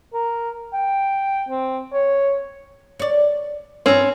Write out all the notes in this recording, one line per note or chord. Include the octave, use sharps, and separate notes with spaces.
A#4
G5
C4
C#5
C#5 D5
G2 E3 C4 C#4